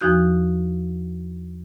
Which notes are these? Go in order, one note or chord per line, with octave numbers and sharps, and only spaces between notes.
E2 F3 D#4 F#4 G6